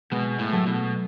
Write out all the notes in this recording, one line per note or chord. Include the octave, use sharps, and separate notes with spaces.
B2 G#3 B3
A2
F#3 A3
B2